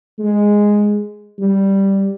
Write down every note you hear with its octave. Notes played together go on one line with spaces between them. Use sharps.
G#3
G3